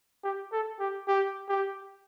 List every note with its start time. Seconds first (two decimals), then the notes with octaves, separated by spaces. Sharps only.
0.24 G4
0.52 A4
0.80 G4
1.08 G4
1.49 G4